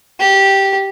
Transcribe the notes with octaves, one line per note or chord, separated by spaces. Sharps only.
G4